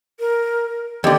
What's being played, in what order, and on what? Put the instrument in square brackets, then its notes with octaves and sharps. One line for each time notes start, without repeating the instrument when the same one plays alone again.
[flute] A#4
[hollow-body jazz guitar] D#2 D3 [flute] G4